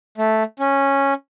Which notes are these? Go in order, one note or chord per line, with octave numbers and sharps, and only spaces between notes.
A3
C#4